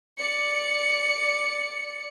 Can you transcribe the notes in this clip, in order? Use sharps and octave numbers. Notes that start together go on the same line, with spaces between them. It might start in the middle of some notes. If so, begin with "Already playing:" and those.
D5 C#7